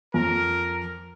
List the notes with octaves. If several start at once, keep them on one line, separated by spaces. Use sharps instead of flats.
F2 A#4